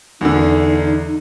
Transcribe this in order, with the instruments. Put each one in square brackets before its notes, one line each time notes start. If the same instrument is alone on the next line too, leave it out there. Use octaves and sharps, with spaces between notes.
[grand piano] E2 D3 [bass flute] D#4